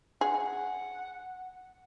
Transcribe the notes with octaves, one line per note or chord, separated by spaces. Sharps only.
G#4 F#5